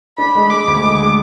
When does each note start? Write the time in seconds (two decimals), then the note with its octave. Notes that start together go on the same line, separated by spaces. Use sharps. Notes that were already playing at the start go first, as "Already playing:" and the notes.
0.18 D4 B5
0.35 G#3
0.50 G#3 D6
0.67 D2
0.84 G#3
1.00 G#3